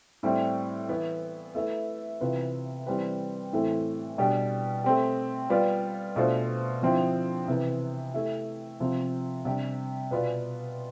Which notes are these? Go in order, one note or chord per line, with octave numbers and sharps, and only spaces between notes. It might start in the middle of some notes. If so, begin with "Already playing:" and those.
A2 G3 C4 E4
E3 B3 E4
A3 E4 B4 E5
C3 E3 B3 F4 B4
E3 G3 C4 G4 B4
A2 E3 A3 C4
B2 G3 D4 G4 D5
A3 C4 G4
G3 B3 F4 B4 D5
B2 A3 D4 F4 C5
D3 F3 C4 E4
C3 E3 B3
A3 E4 G4
C3 F3 C4
C3 G3 D4 G4
B2 B3 F4 B4 D5